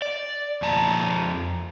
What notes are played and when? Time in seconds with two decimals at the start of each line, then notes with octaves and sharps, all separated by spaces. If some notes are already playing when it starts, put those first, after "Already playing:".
0.02 D5
0.62 F2 A5 A#5